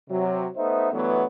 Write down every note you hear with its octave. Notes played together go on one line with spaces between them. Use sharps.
C3 F#3
A3 B3 D#4 C5 E5
G2 E3 F#3 A3 B3